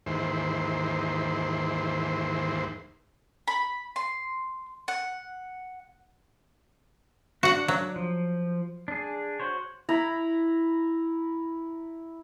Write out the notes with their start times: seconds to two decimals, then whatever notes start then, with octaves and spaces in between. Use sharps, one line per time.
0.06 D#2 G#2 E3 C5
3.48 B5
3.96 C6
4.88 F#5
7.43 D4 F#4 F#5
7.68 F#3
7.96 F3
8.88 D4 G#4
9.40 F#4 C5 C#5
9.89 E4 A#5 B5